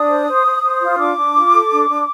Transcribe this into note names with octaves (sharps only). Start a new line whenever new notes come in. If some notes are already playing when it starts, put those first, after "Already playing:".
Already playing: D4 D#6
C5
C5
C5
C5
F4
D4 D6
D4
F4
A4
D4
D4